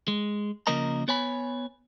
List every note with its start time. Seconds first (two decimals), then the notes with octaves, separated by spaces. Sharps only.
0.08 G#3
0.67 C#3 F3 A#3 A#4 D#5 A#5
1.08 B3 C#5 G#5 B5